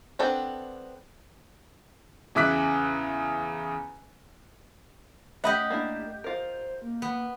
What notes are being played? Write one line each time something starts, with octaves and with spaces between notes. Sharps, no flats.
B3 C4 D4 A4
E2 C#3 E5 D6 F#6 B6
A3 G4 D#5 E5 F#5 B5
A#3 D4 E4
F4 A#4 C5
A#3
B3